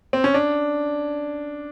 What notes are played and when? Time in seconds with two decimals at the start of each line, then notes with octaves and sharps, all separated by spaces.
0.13 C4
0.24 C#4
0.34 D4